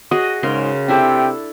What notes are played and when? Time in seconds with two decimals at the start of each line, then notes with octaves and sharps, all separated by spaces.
0.11 F#4 G#4 D#5
0.43 G#2 C#3 A#4 C6
0.88 C3 D4 E4 A4 G5